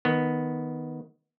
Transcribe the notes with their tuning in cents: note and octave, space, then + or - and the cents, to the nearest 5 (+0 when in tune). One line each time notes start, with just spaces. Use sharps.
D#3 +10 B3 +0